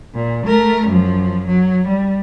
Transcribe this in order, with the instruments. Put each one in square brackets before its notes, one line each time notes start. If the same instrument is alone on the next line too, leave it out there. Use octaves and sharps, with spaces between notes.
[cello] A#2
A3 A#4
F#2 F3
F#3
G3